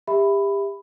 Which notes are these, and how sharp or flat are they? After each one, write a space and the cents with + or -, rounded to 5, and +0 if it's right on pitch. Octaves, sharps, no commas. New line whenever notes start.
G4 +30 E5 +0 B5 +10